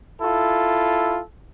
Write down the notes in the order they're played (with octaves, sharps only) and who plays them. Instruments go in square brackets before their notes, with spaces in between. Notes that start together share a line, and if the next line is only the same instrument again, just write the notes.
[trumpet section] E4 F4 A4